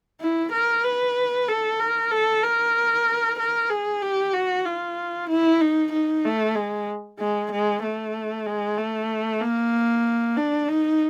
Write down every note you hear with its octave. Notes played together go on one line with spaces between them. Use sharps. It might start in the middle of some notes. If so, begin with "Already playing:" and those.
E4
A#4
B4
A4
A#4
A4
A#4
A#4
G#4
G4
F#4
F4
E4
D#4
D#4
A3
G#3
G#3
G#3
A3
G#3
A3
A#3
D4
D#4